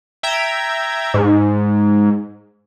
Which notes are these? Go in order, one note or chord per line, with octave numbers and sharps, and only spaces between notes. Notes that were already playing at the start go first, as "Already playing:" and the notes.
E5 G5 A#5 G#6
G#2